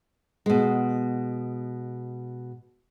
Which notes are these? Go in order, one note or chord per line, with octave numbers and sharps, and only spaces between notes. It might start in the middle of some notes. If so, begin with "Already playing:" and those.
B2 G#3